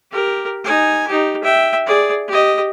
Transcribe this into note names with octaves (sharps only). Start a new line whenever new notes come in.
G4 A#4
D#4 G#5
D#4 G4
E5 G5
G#4 D5
G4 D#5